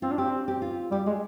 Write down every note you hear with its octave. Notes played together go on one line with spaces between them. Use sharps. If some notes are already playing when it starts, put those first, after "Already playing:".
C4 F4
D4
C4 G4
G4
F4
G3 G4
G#3 G#4